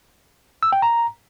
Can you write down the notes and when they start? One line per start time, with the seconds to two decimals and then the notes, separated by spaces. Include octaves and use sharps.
0.63 E6
0.72 G5
0.82 A#5